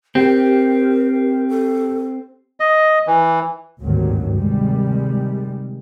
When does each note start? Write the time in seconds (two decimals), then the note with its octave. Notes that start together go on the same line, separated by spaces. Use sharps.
0.15 C4 G4 A#4
1.49 A4
2.60 D#5
3.07 E3
3.81 G#1 D2 G2 A#2 D#3 F#3
4.34 C3 D#3 G3 G#3